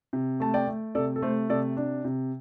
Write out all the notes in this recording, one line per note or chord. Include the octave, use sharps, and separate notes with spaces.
C3
A3 A5
D5 G5
A3
C3 A4 D5
A4
A3 C5
C3 A4 D5
D4
C3